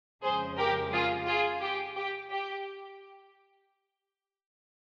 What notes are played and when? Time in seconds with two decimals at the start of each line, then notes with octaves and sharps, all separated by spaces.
0.23 F2 C#3 F3 G#3 G#4 C5
0.58 G4 A#4
0.92 F4 G#4
1.27 F4 G#4
1.61 G4
1.96 G4
2.31 G4